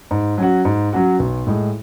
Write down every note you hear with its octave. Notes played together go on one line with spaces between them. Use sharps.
G#2
F#3 C#4 F#4
G#2
F#3 C#4 F#4
B1
A2 G#3